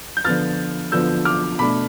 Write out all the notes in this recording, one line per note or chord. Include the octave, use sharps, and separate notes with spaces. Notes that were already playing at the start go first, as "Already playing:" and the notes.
G6
D3 F3 B3 F4 F6 A6
D3 F3 B3 F4 E6 G6
D6 F6
B2 A3 D4 B5 D6